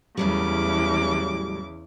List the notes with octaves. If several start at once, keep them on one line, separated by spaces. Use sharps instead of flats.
E2 A2 C#3 F#3 G3 D6